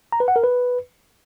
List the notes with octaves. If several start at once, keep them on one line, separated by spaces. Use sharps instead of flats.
A#5
B4
F#5
A#4
B4